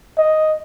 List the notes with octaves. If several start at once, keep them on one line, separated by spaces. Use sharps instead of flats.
D#5